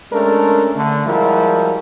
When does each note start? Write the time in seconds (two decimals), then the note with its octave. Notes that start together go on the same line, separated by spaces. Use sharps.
0.12 G#3 A3 C#4 D4 A4 A#4
0.75 D3 A3
1.07 F3 G3 G#3 E4 F#4 A#4